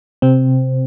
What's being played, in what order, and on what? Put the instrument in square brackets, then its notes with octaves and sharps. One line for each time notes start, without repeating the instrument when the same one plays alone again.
[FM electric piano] C3 C4